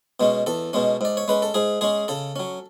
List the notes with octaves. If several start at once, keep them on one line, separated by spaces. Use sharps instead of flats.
B2 G#3 C#4
E2 A4
B2 G#3 C#4
G#2 D5
C#5
G#3 C#4 B4
A4
G#2 G#4
G#3 C#4 G#4
C#3 A4
F#3 C#4